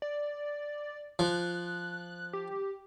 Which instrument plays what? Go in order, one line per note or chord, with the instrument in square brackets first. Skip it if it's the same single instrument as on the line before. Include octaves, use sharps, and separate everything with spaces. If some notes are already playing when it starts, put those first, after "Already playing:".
[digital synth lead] D5
[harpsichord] F3 [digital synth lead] F#6
[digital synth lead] G4